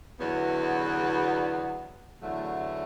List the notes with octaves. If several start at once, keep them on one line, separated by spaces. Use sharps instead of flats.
E2 D3 F#3 B3 F#4
E2 D3 F#3 A3